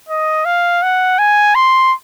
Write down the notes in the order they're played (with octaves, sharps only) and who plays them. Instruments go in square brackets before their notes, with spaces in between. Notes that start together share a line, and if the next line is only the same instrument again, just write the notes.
[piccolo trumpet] D#5
F5
F#5
G#5
C6